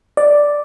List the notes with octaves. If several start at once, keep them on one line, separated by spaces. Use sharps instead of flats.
D5